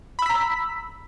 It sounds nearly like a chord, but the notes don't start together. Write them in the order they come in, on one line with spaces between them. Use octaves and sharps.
B5 E6 B6 A#5